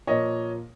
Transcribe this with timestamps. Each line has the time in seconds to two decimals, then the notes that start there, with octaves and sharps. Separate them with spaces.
0.07 A#2 F3 A#3 C#5 D#5